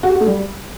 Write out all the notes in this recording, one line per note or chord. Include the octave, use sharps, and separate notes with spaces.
F#4
G4
F#4
A3
G3